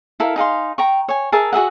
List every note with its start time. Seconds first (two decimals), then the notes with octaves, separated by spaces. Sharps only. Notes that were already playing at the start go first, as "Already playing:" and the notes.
0.20 E4 A4 A#4 F5
0.36 D#4 G#4 F5 C6
0.78 G5 A#5 C#6
1.08 C#5 G#5
1.32 G#4 A#4 E5 A5
1.52 F#4 G#4 E5 F#5